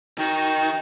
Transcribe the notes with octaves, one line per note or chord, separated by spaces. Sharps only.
D#3 D#4 F#4 G5